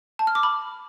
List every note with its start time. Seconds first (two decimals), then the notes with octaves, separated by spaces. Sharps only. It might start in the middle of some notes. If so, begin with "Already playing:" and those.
0.19 A5
0.27 F6
0.35 D6
0.43 B5